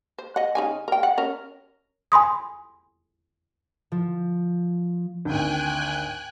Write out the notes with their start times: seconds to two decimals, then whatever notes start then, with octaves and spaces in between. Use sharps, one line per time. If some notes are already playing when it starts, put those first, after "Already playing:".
0.18 C5
0.36 D#5 F#5
0.55 C#3 D#4 G#5
0.88 A#4 G5
1.03 F#5
1.18 C#4 A#4
2.12 G#5 B5 C6 D#6
3.92 F3
5.25 G#1 D2 G5 G#5 F#6